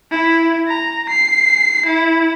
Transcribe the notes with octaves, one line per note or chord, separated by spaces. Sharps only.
E4
A#5
C7
E4